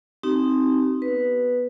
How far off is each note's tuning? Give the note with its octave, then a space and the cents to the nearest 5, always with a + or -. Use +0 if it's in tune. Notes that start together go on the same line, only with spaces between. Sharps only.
C4 +0 D#4 +0 G4 -40
B3 +0 B4 +0